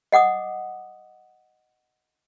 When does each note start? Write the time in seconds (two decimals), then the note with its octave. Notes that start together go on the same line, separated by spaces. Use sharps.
0.12 D#5 F#5 D6 D#6